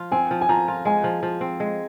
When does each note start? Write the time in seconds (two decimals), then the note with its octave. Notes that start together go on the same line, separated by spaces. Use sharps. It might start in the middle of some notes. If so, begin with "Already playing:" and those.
Already playing: F3 F4
0.12 C4 G#5
0.31 F3
0.41 G#5
0.49 F3 A#5
0.68 F4
0.85 G#3 G#5
1.04 F3
1.23 F3
1.41 C4
1.60 G#3